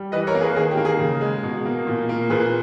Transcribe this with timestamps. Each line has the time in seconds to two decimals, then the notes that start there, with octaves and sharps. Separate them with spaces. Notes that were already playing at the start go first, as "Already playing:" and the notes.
Already playing: G3
0.12 E3 B4 D#5
0.27 A#4 C#5
0.35 A#3
0.41 G#4 B4
0.56 D#3 G#4
0.71 G4
0.77 A#3
0.85 G#4
0.99 C#3
1.21 G#3
1.43 B2
1.66 A#3
1.87 A#2
2.09 A#3
2.30 A#2 G#4 B4